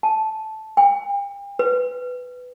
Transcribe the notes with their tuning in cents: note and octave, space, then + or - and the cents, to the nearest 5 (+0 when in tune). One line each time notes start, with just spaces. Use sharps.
A5 -10
G5 +40
B4 +10